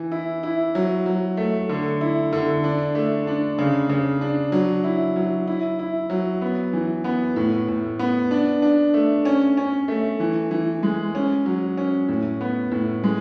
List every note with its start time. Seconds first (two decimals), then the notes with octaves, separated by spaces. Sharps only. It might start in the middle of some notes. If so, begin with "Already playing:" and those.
Already playing: E3
0.12 E4
0.43 E4
0.75 F#3
1.06 F#3
1.37 A3
1.69 D3
2.01 E4
2.33 D3
2.64 D4
2.95 A3
3.27 D4
3.58 C#3
3.89 C#3
4.21 D4
4.52 F#3
4.84 E4
5.16 F#3
5.47 E4
5.79 E4
6.10 F#3
6.41 B3
6.73 E3
7.04 B3
7.36 A2
7.68 A2
7.99 B3
8.31 D4
8.62 D4
8.94 A3
9.25 C#4
9.57 C#4
9.88 A3
10.20 E3
10.51 E3
10.83 G#3
11.15 C#4
11.46 F#3
11.77 C#4
12.08 A2
12.41 B3
12.71 A2
13.04 G#3